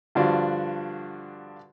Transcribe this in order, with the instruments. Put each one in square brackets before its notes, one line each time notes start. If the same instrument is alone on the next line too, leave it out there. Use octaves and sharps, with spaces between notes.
[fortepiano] G2 D3 F3 D4 F4 F#4